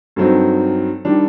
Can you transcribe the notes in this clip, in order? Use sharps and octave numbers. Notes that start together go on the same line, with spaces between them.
G2 F#3 C4 D#4 A4
D#3 G3 D4